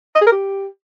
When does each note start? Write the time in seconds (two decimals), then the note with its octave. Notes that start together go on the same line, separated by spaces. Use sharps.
0.16 D#5
0.21 G#4
0.27 A#4
0.32 G4